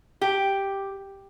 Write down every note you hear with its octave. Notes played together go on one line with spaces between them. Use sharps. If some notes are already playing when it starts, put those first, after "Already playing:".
G4